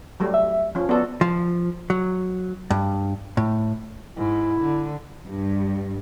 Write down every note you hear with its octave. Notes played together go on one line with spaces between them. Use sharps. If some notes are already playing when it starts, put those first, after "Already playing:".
F#3 G3 A3
E5
F3 C#4
B3 F#4 A4 D5
F3
F#3
G2
A2
G#2 E4
D3
G2